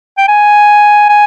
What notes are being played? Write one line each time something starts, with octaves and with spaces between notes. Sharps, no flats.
G5
G#5
G#5